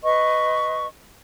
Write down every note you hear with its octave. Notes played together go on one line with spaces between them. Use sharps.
B4 D#5 C#6